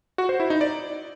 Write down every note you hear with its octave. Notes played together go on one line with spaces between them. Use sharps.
F#4
C5
E4
D#4
D5